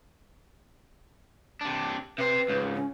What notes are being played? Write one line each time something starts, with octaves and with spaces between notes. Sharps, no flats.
C3 D4
C3 B4 C5
C#2 G#2
C#4